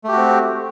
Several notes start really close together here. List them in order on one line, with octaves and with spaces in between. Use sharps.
A3 G4 F#4 C4